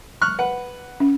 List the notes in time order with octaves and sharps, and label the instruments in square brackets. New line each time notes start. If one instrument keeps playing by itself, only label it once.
[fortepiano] C#6 F6 F#6
B4 F#5
[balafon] C#4